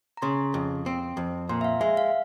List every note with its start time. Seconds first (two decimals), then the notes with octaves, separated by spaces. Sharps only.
0.17 A#5
0.22 C#3 C6
0.54 F2
0.86 C4
1.17 F2
1.49 A#2 C6
1.61 E5
1.64 F5
1.81 G#3 E5
1.97 F5